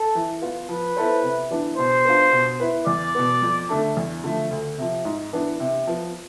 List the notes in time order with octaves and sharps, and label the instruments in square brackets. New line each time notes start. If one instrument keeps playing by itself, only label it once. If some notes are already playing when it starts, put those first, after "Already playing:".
Already playing: [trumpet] A4
[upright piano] E3
B3 F4
[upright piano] F3 [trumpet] B4
[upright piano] B3 E4 A4 C5
C3
E3 B3 D4
[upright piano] B2 [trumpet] C5
[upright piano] B3 D4 F4
B2
B3 E4 B4
[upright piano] E2 [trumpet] D5
[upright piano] B2 B3
F2
D3 A3 D4 A4
E2
D3 F3 A3
D2
C3 F3
G#2
E3 B3 D4
C3
F3 B3